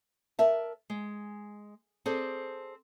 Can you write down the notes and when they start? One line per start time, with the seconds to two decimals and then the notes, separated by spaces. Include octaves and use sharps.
0.39 A#4 D5 E5 A5
0.90 G#3
2.06 C4 G#4 A4 C5 D5